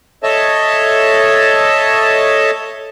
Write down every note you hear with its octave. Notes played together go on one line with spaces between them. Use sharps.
A4 C#5 D#5 E5 A5